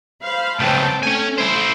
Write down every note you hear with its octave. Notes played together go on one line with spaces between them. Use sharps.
C5 F5 B5
C#2 A2 C4 G5 A5
A3 C#4 G#5
E4 C5